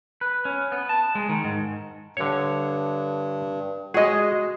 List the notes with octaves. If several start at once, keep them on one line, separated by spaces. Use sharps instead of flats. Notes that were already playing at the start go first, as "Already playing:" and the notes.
B4
C#4
B3
A5
G#3
D#3
G#2
G2 D3 C#5
G#3 F#4 G#4 D#5